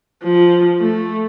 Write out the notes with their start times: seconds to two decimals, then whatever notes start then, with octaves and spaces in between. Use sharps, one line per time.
0.23 F3
0.80 A3